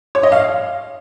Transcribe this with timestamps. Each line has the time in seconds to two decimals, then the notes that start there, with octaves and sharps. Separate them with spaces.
0.15 C#5
0.23 D#5
0.32 F5